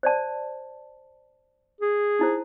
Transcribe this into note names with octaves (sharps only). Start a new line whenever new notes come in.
C5 D5 A5
G#4
D#4 E4 C5